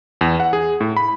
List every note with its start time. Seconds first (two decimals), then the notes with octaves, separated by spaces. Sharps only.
0.21 E2
0.40 F#5
0.53 G#4
0.81 A2
0.97 B5